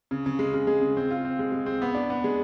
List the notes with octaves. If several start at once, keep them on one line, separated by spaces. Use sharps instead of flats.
C#3
C#3
G#3
C#3
G#3
C#3
C4
F4
C4
G#3
G#3
C4
B3
D4
B3
G#3